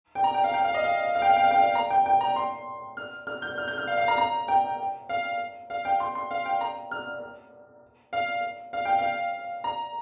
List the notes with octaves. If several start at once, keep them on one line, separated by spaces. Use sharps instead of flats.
G5
A#5
G5
F5
G5
F5
D#5
F5
F5
G5
F5
G5
F5
G5
F5
A#5
G5
G5
A#5
C6
F6
F6
G6
F6
G6
F6
F5
F5
A#5
A#5
G5
F5
F5
G5
C6
C6
F5
G5
A#5
F6
F5
F5
G5
F5
A#5